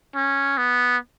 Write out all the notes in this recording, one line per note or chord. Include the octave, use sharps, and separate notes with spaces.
C#4
B3